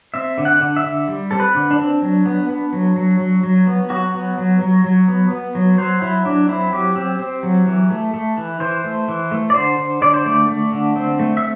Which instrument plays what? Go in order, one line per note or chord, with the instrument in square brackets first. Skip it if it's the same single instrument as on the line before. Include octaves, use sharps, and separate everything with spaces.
[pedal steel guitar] C4 E5
D3
F#5
D3
E5
D3
G3
C4 A4
B4
D3
D4
C4
F#3
B3
B3
F#3
F#3
F#3
F#3
B3
F#3 F#4
B3
F#3
F#3
F#3
B3
B3
F#3
F#3 C5
F#3 E4
F#3 D4
C4 E4
F#3 G4
C4
C4
F#3
E3
A3
A3
E3
E3 C5
A3
E3
A3
D5
D3 C5
D3
D3 D5
C5
A3 D5
A3
D3
C4
A3
E5